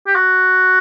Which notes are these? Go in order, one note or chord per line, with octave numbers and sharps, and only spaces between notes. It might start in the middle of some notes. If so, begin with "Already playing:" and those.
G4
F#4